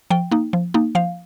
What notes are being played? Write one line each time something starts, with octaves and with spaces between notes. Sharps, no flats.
F3 G5
A#3 D#4
F3
A#3 D#4
F3 F5